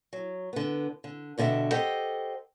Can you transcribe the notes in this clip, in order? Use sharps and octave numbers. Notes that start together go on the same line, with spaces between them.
F#3
D3 B3
D3
G2 B2 D3 E4 E5 F#5
G4 A4 C5 D#5 F#5